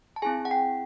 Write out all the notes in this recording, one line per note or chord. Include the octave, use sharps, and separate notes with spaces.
A5
C4 E4 G#4 G#5
F#5
G5